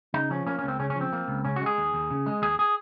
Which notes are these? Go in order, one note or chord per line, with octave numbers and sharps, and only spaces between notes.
C#3 D#4
F3 C#4
A#3 C#4
C#4
C#2 C4
C#3 C#4
C#4
F3
C4
A#3
C#2
C#3 C#4
F#4
G#3 G#4
D#2
D#2
C#3
G#3
D#2 G#4
G#4